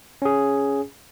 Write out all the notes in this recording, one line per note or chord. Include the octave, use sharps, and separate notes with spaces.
C#4 G#4